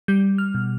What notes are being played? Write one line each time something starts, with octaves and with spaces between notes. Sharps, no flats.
G3 G6
F6
B2